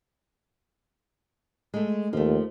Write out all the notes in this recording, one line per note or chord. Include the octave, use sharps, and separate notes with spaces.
G#3 A3
D#2 F3 A3